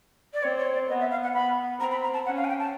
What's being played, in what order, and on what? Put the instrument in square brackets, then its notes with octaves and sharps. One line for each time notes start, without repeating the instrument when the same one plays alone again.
[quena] D5
[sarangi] C4 [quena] C#5
[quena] C#5
D5
[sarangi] B3 [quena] D#5
[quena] E5
F5
F#5
[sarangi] B3 [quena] B5
[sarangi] C4 [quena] A#5
[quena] B5
A#5
A5
[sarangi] C#4 [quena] F#5
[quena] F5
G#5
G5
A5